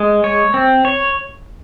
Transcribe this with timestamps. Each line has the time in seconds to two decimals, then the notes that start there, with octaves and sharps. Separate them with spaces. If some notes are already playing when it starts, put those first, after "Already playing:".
Already playing: G#3
0.24 C#5
0.54 C4
0.85 C#5